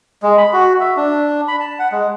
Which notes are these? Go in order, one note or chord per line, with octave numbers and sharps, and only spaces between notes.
G#3
B5
F#4
E5
D4
B5
A5
F#5
G#3